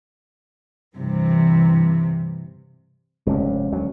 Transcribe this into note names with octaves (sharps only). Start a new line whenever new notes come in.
G2 C3 E3
F1 G2 G#3 C#4
D2 F#3